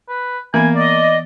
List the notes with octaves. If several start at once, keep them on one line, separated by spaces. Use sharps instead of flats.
B4
E3 A#3 B3 G#5
D5 D#5